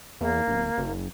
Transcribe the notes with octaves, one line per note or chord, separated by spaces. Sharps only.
E2 A#3
D1
F#1